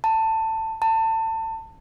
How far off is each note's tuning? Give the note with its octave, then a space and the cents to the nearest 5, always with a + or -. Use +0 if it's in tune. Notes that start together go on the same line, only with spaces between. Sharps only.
A5 +15
A5 +25